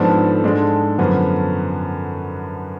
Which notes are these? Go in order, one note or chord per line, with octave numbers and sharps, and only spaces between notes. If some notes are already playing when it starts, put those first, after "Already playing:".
Already playing: G#2 F3 B3 D4 A4
G#2 G#3 D4
F#2 D3 F3 B3